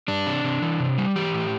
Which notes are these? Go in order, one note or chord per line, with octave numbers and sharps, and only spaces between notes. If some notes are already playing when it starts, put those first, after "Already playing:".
G3 D4
C3
C3
E3
C3
G3
E3 G4
A2